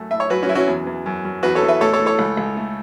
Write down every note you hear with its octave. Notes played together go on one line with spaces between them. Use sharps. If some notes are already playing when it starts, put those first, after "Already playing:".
Already playing: F#2 A3
A2 E5
C#5
F#2 F#4 B4
C#4 F#4
F#2 E4
C#4 F#4
E2
E2
F#2
F#2
E2 F#4 B4
A4 C#5
E2
B4 E5
A2 A4 C#5
A4 C#5
A2
A4 C#5
C#2
C#2
A3